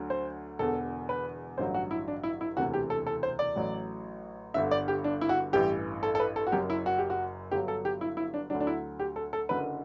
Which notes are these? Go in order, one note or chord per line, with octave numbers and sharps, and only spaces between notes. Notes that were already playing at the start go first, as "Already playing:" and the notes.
Already playing: D2 D3 F#3
C5
E1 E2 D3 A4
B4
A1 G2 D3 F#3 C5
F#4
E4
D4
E4
E4
E1 D2 C3 E3 F#4
G4
A4
A4
C5
D5
A1 A2 F#3
G1 G2 D3 E5
D5
G4
D4
E4
F#4
A1 G2 E3 G4
A4
A4
B4
A4
F#4
F#1 F#2 F#3 G4
E4
F#4
G4
F#4
G1 G2 F#3 G4
A4
G4
E4
E4
D4
D2 D3 F#3 D4
D4
E4
G4
A4
A4
F#1 F#2 D3 B4